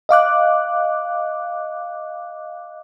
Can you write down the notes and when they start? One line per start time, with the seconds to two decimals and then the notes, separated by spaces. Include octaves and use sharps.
0.09 D#5 F5 D6 F#6